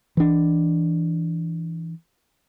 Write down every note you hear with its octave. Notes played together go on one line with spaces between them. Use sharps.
E3 D4